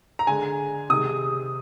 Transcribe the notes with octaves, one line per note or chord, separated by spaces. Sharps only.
A#5
D3 G#3 G#5
C3 D#3 G#3 D#6